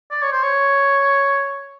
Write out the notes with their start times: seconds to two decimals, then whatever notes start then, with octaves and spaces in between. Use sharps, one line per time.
0.11 D5
0.22 C#5
0.32 C5
0.42 C#5